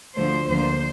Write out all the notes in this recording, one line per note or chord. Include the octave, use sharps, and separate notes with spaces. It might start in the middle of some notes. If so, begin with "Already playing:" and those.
D2 D3 F3 A3 C5
D2 D3 F3 A#3 C5